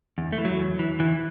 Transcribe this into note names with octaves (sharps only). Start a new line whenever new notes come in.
E2
A3
E3
F#3
E2
E3
E2 E3